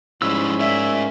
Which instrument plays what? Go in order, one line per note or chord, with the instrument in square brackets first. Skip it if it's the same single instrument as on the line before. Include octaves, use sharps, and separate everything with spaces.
[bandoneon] G#2 G#3 C#4 [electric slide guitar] F3 G3 E4 [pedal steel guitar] E6
[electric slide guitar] A#4 D5 [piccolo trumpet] E5